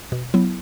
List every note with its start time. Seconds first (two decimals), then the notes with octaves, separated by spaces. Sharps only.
0.12 B2
0.34 F#3 B3 E4